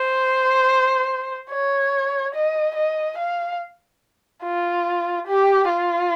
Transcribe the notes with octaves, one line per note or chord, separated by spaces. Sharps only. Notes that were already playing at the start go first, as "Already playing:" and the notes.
Already playing: C5
C#5
D#5
D#5
F5
F4
G4
F4